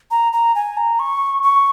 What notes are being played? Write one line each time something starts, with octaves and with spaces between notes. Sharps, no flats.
A#5
A#5
G#5
A#5
C#6
C#6